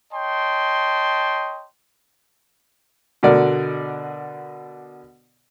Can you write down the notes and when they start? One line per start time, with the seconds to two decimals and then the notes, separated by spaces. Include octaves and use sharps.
0.13 C#5 D#5 G5 A5 C6
3.23 B2 D3 A#4 D5